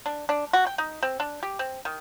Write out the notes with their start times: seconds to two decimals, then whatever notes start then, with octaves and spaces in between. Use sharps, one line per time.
0.06 D4
0.29 D4
0.53 F#4
0.67 G5
0.78 D#4
1.03 C4
1.20 D4
1.43 G4
1.59 C4
1.85 D#3